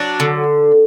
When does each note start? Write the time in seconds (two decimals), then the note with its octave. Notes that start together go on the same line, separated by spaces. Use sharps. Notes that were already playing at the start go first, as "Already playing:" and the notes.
Already playing: F#3 D4
0.20 D3